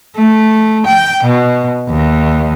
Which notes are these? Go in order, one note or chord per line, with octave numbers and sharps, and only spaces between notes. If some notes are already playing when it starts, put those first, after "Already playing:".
A3
G5
B2
D#2